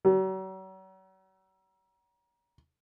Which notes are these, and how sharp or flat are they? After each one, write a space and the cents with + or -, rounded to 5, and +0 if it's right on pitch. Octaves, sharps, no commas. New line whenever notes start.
F#3 +40